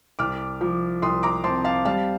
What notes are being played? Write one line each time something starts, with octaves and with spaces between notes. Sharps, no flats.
C2 D6 F6
F3
C2 C6 D#6
A#5 D6
C4 A5 C6
F5 A5
G3 F5 A5